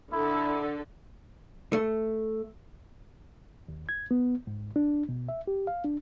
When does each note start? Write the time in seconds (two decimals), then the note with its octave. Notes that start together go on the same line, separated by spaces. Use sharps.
0.13 D3 E4 A4
1.73 A3
3.68 D#2
3.89 G#6
4.11 B3
4.47 G#2
4.76 D4
5.09 B2
5.29 E5
5.47 G4
5.67 F5
5.84 D4